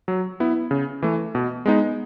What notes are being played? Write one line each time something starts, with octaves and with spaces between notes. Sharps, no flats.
F#3
B3 E4
C#3
E3 A3
B2
G#3 B3 D#4